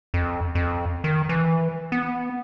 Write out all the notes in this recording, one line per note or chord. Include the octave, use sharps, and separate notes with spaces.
F2
F2
D#3
E3
B3